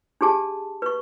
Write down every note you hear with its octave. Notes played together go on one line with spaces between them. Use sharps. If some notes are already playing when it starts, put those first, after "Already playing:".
D4 G4 G#4 A5
B4 C#6